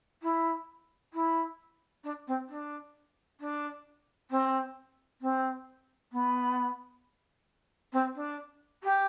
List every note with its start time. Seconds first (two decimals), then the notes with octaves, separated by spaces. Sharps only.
0.22 E4
1.13 E4
2.04 D4
2.27 C4
2.49 D4
3.40 D4
4.31 C4
5.21 C4
6.12 B3
7.92 C4
8.15 D4
8.83 G4